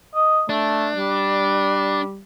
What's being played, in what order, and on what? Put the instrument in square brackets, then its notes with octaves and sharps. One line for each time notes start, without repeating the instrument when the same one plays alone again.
[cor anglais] D#5
[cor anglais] A3 [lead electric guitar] D4
[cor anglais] G3